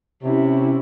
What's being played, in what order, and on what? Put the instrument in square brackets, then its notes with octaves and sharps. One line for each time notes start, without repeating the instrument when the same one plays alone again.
[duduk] C3 [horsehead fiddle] C#4 E4